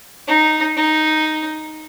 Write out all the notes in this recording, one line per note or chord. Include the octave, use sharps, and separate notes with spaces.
D#4
D#4